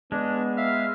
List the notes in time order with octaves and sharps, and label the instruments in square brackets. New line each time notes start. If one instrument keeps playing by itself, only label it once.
[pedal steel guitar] G#3 [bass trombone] B3 [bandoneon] D4
[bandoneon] E5 F5 F6